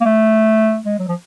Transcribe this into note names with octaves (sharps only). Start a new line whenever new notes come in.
A#3
A3
G#3
F#3
F3